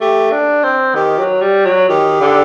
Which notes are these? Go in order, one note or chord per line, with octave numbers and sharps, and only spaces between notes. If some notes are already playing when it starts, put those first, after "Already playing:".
A3 G4
D4
C4
D#3 G4
F#3
G3
F#3
D#3 G4
D3